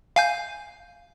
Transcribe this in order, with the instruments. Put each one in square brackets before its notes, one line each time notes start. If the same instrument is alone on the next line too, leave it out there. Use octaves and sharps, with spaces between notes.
[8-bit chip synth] F5 G#5 G6